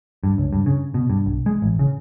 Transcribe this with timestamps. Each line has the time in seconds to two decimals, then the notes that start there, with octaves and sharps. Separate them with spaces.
0.24 G2
0.38 C#2
0.53 G2
0.66 C#3
0.94 B2
1.10 G2
1.26 B1
1.46 G#3
1.62 A1
1.79 C#3